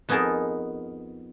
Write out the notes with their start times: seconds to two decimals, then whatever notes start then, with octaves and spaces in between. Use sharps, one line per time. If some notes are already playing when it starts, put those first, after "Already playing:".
0.09 F2 B3 D#4 G#4 A#4 A5